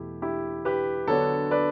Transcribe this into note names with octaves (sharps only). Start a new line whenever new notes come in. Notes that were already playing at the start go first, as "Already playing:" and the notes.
Already playing: E2 B2 A3 E4 G4
E4 G4
G4 B4
D3 F#3 B3 D4 A4 C#5
B4 D5